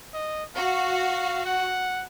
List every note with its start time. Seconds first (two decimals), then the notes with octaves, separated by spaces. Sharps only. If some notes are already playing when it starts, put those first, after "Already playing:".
0.14 D#5
0.56 F#4 F5
1.45 F#5